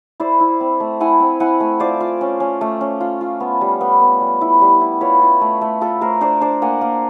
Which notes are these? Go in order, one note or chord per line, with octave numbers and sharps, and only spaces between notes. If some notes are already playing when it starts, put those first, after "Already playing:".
E4 C5 D5
E4
C4
A3
E4 F#5 G#5
C4
E4 F#5 G#5
A3
F4 C5 D5
F4
C#4
C#4
A3
C#4
F4
F4
B3
G3
B3
B3
G3
E4
G3
E4
F4 B4 C#5
F4
A3
A3
F4 A4 B4
A3 A#4 C5
D4 C5 D5
D4 C5 D5
A#3 F#5 G#5
A#3